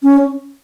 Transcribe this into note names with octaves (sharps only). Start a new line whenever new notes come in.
C#4